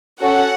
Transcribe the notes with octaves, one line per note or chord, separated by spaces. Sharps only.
C#4 F#4 A4 F#5